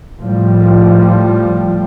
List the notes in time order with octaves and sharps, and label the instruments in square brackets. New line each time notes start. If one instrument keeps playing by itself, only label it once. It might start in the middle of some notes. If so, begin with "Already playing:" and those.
[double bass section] A2 F3 G3